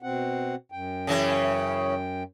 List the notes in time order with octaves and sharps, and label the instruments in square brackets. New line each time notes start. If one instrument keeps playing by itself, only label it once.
[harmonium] B2 C4 F#5
F#2 G5
[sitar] C#3 E3 C#4